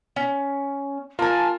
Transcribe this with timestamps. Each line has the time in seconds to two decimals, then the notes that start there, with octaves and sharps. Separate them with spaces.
0.16 C#4
1.19 A#3 F4 A#4 G#5 A5